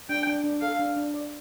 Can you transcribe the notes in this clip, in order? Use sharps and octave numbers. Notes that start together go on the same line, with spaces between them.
D4 G5
D4
D4
A4 F5
D4
D4
D5